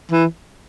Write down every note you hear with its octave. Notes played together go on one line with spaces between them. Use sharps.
E3